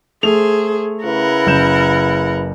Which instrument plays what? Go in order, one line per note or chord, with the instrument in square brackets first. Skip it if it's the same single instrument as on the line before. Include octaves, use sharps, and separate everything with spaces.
[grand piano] A3 F7 [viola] G#4 C5
[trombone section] C#3 E4 B4 [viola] A#4 F#5
[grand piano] F#1 G6 E7